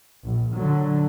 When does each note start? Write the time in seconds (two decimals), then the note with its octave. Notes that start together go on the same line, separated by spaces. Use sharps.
0.22 A#1
0.55 D3 F#3